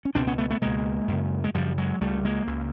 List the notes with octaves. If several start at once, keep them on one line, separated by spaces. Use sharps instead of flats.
C#4
C#2 B2 C4 D4
B3 C#4
A3 B3
A3 B3
C#2 B2 G#3 A#3
F#2 C#3
G#3
F#2 C#3 F3 G3
F#3 G#3
C#2 C#3 G3 A3
G#3 A#3
C#2 C#3